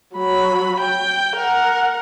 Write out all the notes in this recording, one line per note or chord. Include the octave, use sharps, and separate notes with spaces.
F#3 B5
G5
A#4 F#5